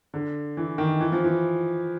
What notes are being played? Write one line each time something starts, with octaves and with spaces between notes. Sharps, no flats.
D3
E3
D#3
E3
F3
E3